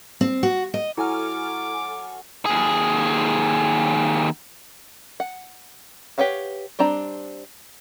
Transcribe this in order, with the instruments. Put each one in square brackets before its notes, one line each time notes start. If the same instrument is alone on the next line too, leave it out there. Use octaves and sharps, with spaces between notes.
[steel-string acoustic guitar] C4
F#4
D#5
[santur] F#3 [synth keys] E4 [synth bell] A4 G#5 F6 [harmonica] D6
[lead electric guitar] D#2 G#4
[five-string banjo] F#5
G4 B4 C#5 F5 F#5
G3 C4 D4 A#5